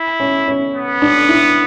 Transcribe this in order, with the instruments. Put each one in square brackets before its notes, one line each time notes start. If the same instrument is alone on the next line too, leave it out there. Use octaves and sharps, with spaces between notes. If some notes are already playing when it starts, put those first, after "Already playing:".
Already playing: [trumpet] E4
[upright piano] C#4
C#4
[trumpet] B3
[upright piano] D4
E4